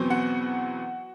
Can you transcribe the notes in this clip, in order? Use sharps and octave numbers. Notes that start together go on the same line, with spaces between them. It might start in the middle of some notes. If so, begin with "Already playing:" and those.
Already playing: E2 B2 F#3 C4
F#4 F#5